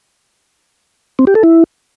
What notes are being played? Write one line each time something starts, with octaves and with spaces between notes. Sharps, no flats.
C4
G4
A4
E4